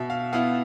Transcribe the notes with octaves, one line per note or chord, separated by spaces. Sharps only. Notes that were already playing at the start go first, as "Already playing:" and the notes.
Already playing: B2 E5
F5
B3 E4 F5